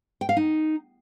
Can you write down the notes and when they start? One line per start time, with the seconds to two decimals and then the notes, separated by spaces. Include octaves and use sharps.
0.21 G5
0.29 F5
0.37 D#4